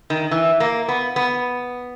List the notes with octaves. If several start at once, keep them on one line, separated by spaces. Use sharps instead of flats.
D#3
E3
A#3
B3
B3